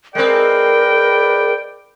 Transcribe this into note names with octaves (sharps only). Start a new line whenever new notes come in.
G#3 C4 A#4 B4 D5 G5